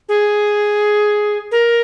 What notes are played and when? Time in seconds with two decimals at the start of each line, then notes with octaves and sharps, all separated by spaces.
0.09 G#4
1.51 A#4